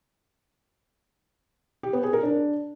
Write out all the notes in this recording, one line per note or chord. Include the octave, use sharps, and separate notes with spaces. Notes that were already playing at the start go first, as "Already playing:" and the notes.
G4
B3
G#4
A#4
D4